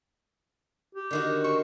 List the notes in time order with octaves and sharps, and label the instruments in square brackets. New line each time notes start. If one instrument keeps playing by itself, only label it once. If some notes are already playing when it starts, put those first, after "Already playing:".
[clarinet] G4
[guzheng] D3 D#3 F#4
[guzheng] C4 [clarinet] C#6